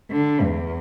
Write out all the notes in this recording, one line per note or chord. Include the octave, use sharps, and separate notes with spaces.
D3
E2